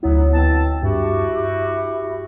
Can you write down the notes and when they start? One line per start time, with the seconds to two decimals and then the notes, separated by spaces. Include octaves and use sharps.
0.03 D2 F#3 B3 E4
0.34 B2 C4 A5
0.83 G2 E4 F#4 G4